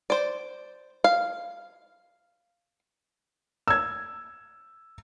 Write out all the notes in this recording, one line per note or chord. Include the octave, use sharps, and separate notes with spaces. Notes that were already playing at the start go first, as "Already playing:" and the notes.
C5 D5
F5
E6 G#6